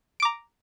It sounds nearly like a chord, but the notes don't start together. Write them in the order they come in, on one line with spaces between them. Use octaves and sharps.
D7 D6 A#5